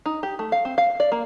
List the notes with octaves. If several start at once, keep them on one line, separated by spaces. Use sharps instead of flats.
D#4
G4
A3
F5
C4
F5
D5
A#3